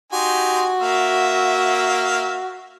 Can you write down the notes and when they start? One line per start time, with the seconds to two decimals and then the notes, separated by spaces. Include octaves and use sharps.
0.13 D#4 F#4 G4 G#5 C6
0.82 A#3 E5 F5